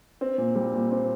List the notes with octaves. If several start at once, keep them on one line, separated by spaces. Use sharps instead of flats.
C4
A#2
G3
A#2
C4